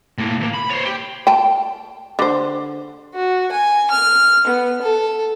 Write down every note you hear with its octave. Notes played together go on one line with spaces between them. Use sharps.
A2 A#3
D2 A#3
B5
C5 C#5
G4
G5 A5
D3 C5
F#4
G#5
F6
B3
A4